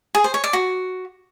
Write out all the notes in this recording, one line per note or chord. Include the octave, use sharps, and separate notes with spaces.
G#4
C5
C#5
D5
F#4